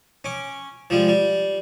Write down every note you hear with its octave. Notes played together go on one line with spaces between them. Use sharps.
C#4 D6
F3 G3 G#3
G3